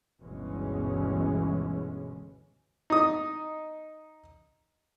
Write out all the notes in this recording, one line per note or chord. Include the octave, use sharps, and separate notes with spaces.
G1 D2 B2 E3 G#3 C#4
D#4 D#6